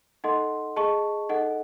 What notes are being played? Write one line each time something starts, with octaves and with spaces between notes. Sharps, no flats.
D#4 A4 D#5 F#5 C6
G#4 D#5 A5 C#6
D#4 A4 D#5 F#5